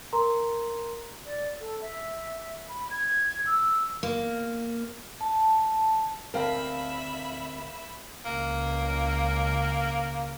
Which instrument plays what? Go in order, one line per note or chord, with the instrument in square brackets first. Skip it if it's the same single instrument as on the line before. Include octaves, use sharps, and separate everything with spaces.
[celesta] A#4 A#5 C6
[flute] D5
A4
E5
B5
G#6
E6
[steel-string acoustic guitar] A#3
[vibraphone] A5
[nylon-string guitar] D2 C4 A5 [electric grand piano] A#4 F5 [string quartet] E5 B5
[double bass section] C#2 [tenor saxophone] A#3